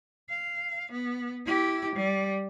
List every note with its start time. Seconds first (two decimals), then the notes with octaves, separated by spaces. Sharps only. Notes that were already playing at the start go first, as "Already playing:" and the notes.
0.29 F5
0.92 B3
1.46 E4 G4
1.95 G3